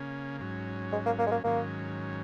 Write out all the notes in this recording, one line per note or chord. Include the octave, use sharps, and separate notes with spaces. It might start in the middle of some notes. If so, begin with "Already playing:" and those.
Already playing: C#3 A#3 C#4
G#2 F#3 C#4
G#3
A#3
A#3
G#3
A#3
G#2 D#3 F#3 A#3 C#4